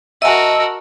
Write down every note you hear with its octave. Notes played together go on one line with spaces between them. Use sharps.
F#4 A#4 D#5 E5 F#5 G#5 A5 E6